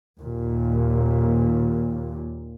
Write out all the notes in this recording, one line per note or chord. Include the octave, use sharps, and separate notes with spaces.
D#2 A#2